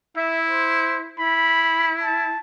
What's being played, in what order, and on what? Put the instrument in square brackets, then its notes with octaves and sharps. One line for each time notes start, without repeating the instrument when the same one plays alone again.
[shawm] E4 [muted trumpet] E5
[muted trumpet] C5
[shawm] E4 [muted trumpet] B5
[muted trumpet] A5